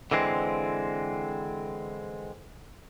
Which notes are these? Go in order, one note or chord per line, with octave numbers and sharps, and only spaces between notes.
D3 E3 G#3 C4